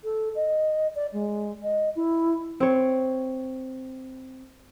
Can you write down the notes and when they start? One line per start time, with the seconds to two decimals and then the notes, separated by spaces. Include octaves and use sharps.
0.04 A4
0.35 D#5
0.95 D5
1.13 G#3
1.63 D#5
1.96 E4
2.60 C4 C#5